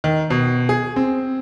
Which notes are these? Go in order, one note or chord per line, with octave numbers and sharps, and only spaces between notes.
D#3
B2
G#4
C4